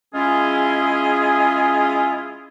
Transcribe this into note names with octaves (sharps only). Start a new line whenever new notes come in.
G#3 C#4 E4 F4 G#4